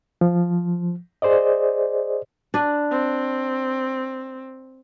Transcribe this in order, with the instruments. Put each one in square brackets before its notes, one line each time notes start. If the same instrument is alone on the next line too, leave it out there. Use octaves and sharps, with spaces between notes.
[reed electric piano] F3
G#4 C5 D5 D#5
[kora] D4 B4
[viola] C4